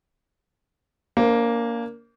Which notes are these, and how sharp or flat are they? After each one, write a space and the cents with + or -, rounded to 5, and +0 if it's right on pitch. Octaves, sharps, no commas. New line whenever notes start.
A#3 +0 D4 -35 C5 +0